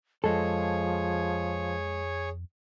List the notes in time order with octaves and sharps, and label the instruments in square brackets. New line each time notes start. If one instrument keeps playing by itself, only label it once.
[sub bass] F2 [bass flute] F3 [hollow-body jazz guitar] G#3 A4 [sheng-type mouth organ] G#4 C#5